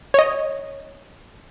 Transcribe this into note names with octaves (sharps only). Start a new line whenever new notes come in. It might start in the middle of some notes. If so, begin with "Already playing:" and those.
C#5 D#5